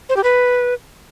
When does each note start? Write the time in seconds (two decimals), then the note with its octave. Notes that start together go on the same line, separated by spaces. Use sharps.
0.09 C5
0.17 G4
0.24 B4